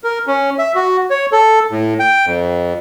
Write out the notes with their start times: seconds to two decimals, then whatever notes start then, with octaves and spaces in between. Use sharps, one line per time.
0.04 A#4
0.27 C#4
0.59 E5
0.75 F#4
1.11 C#5
1.32 A4
1.71 A2
2.00 G5
2.26 F2